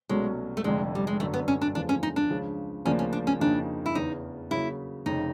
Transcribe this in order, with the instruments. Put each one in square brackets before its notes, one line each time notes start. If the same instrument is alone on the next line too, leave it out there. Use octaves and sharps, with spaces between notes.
[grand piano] C2 B2 F#3 A3 C#4 [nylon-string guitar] G#3
[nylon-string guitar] A3
[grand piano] F1 F2 D3 [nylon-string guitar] G#3
[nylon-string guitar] G3
G#3
[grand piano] G1 F#2 D3 [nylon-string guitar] A3
[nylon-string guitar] B3
C#4
D4
[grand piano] E2 C#3 F3 A3 [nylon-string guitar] D4
[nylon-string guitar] C#4
D#4
D4
[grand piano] C#2 C#3 F3
[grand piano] D2 C#3 F3 A#3 D4 [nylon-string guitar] C#4
[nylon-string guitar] C#4
D4
C#4
[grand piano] F2 C#3 F3 A#3 D#4 [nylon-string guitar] D4
[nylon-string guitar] E4
[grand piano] E2 C#3 E3 [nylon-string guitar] D#4
[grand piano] C#3 F#3 A#3 [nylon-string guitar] E4
[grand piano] F1 F2 C#3 [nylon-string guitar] D#4